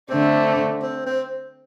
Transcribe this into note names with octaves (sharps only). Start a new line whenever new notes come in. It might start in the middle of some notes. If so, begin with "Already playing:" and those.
D3 A3 C4 D4
C4
C4